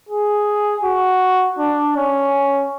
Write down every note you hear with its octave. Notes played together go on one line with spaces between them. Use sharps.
G#4
F#4
D4
C#4